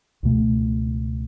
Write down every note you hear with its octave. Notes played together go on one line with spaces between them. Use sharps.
C#2 B2 A3